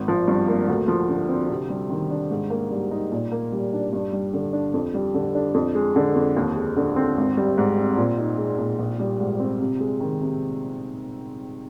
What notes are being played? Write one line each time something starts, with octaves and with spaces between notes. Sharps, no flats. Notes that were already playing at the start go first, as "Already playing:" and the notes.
Already playing: G#1
F3
G2
A#3
D2
F3
D3
C4
C3
G3
D#3
D4
G#2
A#3
G3
D#4
A#2
A#3
G3
D4
G2
G3
D3
D4
F2
G3
D3
D4
F2
G#3
D3
F2
D#2
G#3
D3
C4
G#1
G3
G#2
C4
A#2
D#4
G#3
A#2
A#1
G3
G#2
C4
C3
G#3
D#3
C3